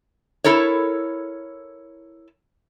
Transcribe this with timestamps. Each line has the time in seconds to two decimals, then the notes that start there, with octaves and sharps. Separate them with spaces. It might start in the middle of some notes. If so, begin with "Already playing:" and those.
0.44 E4 A4 A#4 C#5